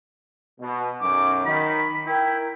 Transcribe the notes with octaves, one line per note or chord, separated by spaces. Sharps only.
B2
B1 F#2 D6
D#3 B5
E4 A#4 G5